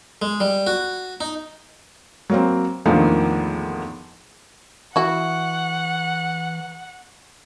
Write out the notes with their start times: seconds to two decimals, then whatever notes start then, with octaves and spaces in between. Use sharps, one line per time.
0.22 G#3
0.40 G3
0.67 F#4
1.21 D#4
2.30 F#3 A#3 C4
2.85 E2 A2 D3 D#3 F3 A#3
4.96 E3 E4 F#4 F#5 C#6